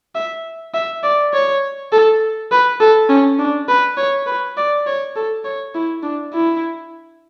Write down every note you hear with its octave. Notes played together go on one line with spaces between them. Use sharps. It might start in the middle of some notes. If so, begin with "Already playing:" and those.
E5
E5
D5
C#5
A4
B4
A4
C#4
D4
B4
C#5
B4
D5
C#5
A4
C#5
E4
D4
E4